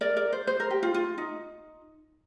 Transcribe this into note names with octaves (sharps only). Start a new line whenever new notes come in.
A#4 D5
A#4 D5
C5
C5
A#4
G4
F4
F4
D#4